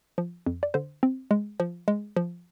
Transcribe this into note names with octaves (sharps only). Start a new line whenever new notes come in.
F3
F2
D5
D3 C5
C4
G#3
F3
G#3
F3